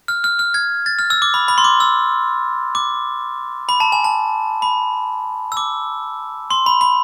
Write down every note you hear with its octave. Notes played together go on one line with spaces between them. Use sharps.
F6
F6
F6
G#6
A6
F6
E6
D6
B5
B5
C6
D6
E6
D6
B5
A5
G#5
A5
B5
E6
D6
C6
B5
B5